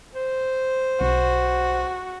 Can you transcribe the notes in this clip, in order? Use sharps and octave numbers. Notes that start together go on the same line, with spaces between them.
C5
B1 F#4